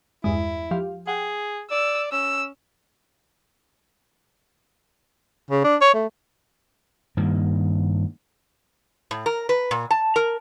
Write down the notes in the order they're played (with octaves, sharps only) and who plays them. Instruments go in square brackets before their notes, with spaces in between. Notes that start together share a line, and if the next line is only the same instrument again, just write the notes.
[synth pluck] E2 G2 G#3 [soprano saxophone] E4
[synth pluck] F3 G4 F5
[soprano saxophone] G#4 [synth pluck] F#5 G5
[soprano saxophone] D5 [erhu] E6
[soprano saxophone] C#4 [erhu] E6
[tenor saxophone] C#3
D4
C#5
A3
[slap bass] G2 D#3 A#3
[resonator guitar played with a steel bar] A2
A#4
B4
A#2
A5
A#4